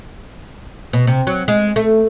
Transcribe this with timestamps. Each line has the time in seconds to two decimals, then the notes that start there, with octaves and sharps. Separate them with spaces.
0.93 B2
1.07 C3
1.27 F#3
1.48 G#3
1.76 A3